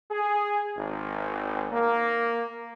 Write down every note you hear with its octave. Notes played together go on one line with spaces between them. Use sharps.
G#4
G#1
A#3